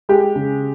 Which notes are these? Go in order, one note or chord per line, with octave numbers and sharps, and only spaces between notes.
G#3 G4
C#3